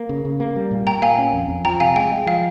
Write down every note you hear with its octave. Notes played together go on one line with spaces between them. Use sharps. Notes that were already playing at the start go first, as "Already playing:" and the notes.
Already playing: A#3
C#3
C#3
A#3
G3
A#2
A#2 G5 A#5
A#3 F5 G#5
C#4
F2
F2
F3 G5 A#5
C3 F5 G#5
G#3 G5
G#3
F3 F5